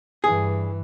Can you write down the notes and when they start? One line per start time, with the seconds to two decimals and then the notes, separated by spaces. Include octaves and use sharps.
0.24 G2 E3 G#4